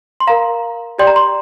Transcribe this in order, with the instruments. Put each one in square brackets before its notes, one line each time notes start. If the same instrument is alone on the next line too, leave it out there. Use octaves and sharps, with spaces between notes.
[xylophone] C6
A#4 F5 A#5
G4 D5 G5 C6
A#5
C6